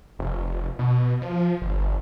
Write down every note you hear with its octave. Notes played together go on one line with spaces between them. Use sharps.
F1
B2
F3
G1